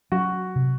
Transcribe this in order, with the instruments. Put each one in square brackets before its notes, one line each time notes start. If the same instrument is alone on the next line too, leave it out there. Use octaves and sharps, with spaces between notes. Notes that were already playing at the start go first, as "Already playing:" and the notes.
[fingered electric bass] F#3 [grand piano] F#4
[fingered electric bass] C3